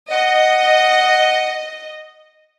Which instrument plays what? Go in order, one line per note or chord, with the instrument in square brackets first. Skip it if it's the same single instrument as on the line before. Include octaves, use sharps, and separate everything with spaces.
[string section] D#5 [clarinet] F#5